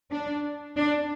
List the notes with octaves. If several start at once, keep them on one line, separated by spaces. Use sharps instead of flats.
D4
D4